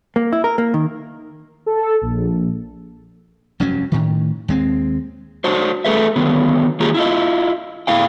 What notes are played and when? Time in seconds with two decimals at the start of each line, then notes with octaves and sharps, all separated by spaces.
0.16 A#3
0.33 E4
0.44 A#4
0.58 A#3
0.74 D#3
1.66 A4
2.02 A#1
3.60 F1 G2 F#3 C#4
3.92 A2 D#3
4.48 D#2 G#3 C4
5.44 F#3 D4 F#4 C5
5.85 A3 G#4 A4 B4 E5
6.16 D3 D#3 F#3 B3
6.80 D#3 A#3 F4 G4 G#4 A#5
6.94 E4 F4 D#5
7.87 A2 E4 F5 G5